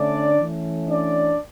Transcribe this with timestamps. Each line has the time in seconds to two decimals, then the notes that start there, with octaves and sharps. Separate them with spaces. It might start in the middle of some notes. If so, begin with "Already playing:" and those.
Already playing: D3 A3 C#4 D4 D5
0.40 E3 A3 C#4
0.88 D4 D5